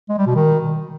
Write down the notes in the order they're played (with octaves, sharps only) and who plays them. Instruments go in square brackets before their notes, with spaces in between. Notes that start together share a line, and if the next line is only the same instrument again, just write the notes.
[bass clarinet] G#3
G3
B2
D#3